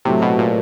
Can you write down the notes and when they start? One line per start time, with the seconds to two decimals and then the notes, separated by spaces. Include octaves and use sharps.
0.05 A2 C3 F#3 A3
0.22 B2
0.38 A#2